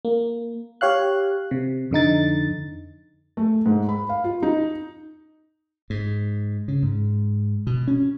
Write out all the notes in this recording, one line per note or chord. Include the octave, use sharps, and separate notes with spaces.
A#3
G4 C#5 F5 F#6
C3
F2 D3 D#4 A6
A3
G#2
B5
F5
F4
D#4
G#2
C#3
G#2
B2
C#4